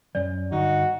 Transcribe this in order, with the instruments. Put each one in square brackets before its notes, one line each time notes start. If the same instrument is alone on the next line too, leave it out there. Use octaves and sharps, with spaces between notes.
[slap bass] F#2 F#3 [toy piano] D5
[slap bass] G1 [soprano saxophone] D#4 [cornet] F#4